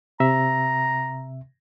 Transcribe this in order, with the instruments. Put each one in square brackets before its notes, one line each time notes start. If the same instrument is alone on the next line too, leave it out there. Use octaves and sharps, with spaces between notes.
[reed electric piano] C3 E5 [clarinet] A#5